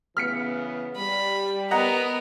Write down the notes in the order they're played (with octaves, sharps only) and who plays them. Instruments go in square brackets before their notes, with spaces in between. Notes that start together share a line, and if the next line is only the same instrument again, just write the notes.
[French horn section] C#3 E3 B3 [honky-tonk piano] F6 B6 C#7
[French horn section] G3 [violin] B5
[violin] B3 A#4 [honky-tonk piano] D#5 F#5 A#5